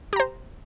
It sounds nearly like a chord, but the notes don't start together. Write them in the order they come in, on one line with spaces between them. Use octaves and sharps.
G4 A#5 C5